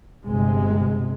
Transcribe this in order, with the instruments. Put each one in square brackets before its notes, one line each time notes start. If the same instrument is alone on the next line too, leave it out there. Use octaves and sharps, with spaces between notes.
[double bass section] G1 C3 G#3